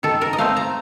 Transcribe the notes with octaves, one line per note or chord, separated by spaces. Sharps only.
D#3 A4
A#4
D#5
A3 C4 F5
A#5